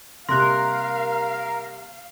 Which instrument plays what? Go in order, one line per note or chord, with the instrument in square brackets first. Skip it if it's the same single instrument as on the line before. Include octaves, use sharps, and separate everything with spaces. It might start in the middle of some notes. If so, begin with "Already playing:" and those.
[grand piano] C3 G3 A#3 [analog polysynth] A#4 [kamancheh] F5 [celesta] C6 F#6